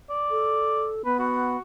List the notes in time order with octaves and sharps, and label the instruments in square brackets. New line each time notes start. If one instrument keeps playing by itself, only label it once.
[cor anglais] D5
[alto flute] A4
[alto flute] B3 [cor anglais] B4
[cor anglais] F#4